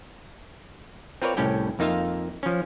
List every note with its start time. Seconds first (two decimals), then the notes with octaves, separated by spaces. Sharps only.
1.22 C4 F4 A#4 B4 C#5 D5
1.37 C2 A2 C#4 G4 G5
1.79 F2 A#3 D#4 F4 E5 F5
2.43 F3 C#4